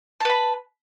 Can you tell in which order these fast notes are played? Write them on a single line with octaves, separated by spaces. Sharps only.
A5 B4 B5